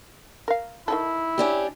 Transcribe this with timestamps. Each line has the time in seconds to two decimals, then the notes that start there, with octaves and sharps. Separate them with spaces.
0.48 A#4 F5
0.88 D#3 D#4 E4 A4
1.38 C#4 D4 G4